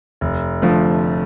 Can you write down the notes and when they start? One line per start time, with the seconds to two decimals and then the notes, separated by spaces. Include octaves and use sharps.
0.21 F1
0.62 F2 D3 F3 A3